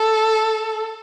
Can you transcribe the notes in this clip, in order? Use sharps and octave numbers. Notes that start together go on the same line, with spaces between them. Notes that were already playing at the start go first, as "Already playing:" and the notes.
Already playing: A4